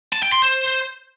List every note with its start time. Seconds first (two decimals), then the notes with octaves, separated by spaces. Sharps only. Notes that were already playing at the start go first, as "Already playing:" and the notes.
0.13 A5
0.22 G5
0.32 C6
0.42 C5